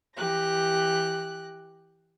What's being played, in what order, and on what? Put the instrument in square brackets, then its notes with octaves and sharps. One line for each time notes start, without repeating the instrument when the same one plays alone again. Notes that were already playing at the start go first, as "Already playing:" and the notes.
[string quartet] E3 G4 F#6 A#6